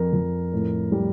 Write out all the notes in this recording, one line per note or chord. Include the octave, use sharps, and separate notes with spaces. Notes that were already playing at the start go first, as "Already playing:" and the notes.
Already playing: F2 A#4
F2
A2
G3